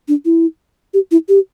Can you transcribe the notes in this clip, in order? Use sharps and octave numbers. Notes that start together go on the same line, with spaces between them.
D4
E4
G4
E4
G4